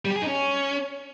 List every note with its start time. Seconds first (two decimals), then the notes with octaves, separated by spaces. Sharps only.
0.05 G3
0.11 G4
0.16 G#4
0.22 D#4
0.27 C#4